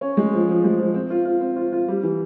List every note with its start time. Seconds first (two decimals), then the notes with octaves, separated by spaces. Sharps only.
0.01 C#4
0.17 G#3
0.33 F3
0.49 F3
0.64 G#3
0.79 F3
0.94 C4
1.10 F4
1.25 F4
1.41 C4
1.56 F4
1.72 F4
1.88 G3
2.03 E3